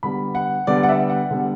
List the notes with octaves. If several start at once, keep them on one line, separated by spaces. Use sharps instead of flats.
D3 G3 B3 B5
F#5
D3 G3 B3 D5
F#5
E5
F#5
D3 G3 B3